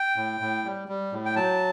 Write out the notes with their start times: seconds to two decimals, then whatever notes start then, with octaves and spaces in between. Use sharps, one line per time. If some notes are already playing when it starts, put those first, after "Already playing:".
Already playing: G5
0.16 A2
0.41 A2
0.64 G3
0.88 G3
1.12 A2
1.26 G5
1.36 F#3 A5